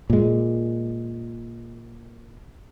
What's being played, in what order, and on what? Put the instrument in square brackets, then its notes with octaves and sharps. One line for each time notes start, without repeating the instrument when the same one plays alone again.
[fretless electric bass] A#2 G#3